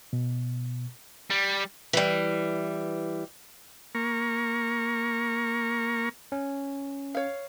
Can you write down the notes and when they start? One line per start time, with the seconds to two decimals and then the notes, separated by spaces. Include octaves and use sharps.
0.13 B2
1.31 G3
1.93 E3 G3
3.95 A#3 A#5 C#6
6.32 C#4
7.15 C#5 F5